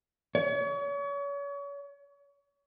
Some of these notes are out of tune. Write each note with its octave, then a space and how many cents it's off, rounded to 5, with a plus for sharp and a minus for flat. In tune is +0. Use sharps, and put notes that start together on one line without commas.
C#5 +35